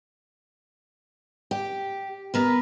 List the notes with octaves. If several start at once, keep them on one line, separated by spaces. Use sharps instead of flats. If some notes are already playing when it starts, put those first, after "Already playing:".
G4
B3 A#4 B4